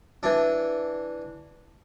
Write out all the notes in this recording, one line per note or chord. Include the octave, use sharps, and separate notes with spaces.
E3 D4